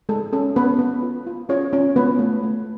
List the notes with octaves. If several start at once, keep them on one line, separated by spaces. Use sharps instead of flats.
G#3 A4
C#4 A4
B3 C#4 B4
B3
F4
F4
C#4 F4 C#5
C#4 F4 C#5
G#3 B3 B4
A3
A3